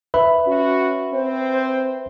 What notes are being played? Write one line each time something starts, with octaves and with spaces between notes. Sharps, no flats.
B4 E5 B5
C#4 F#4
C4 C5